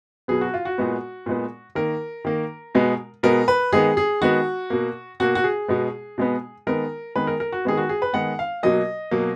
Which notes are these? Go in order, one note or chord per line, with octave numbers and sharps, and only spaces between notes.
B2 F#3 B3 G#4
F#4
F4
F#4
A#2 G#3 B3
A#2 G#3 B3
D#3 A#3 A#4
D#3 A#3
B2 G#3 B3
B2 G#3 B3 A#4
B4
D#3 G#3 B3 G#4
G#4
D#3 G#3 B3 F#4
B2 A#3
B2 A#3 F#4
F#4
G#4
B2 G#3 B3
B2 G#3 B3
D#3 G#3 B3 A#4
D#3 G#3 B3 B4
A#4
A#4
F#4
D#3 G#3 B3 G#4
F#4
G#4
B4
D#3 G#3 B3 F#5
F5
B2 F#3 A#3 D#5
B2 F#3 A#3